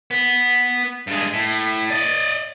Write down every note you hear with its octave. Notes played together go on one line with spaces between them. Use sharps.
B3
G2 G#3
A2
D5 D#5